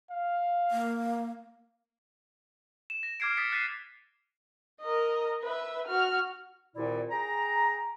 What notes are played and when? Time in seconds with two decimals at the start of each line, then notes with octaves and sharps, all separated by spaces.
0.10 F5
0.71 A#3
2.90 E7
3.03 A#6
3.20 D6 F6 G#6 C7 D7
3.37 D#6 A6 B6 C#7
3.52 F#6 A6 B6 C7 D#7
4.81 A#4 D#5
5.43 B4 E5
5.87 F#4 F6
6.75 C2 A#2 D#3 E4 D5
7.10 G#4 G5 A#5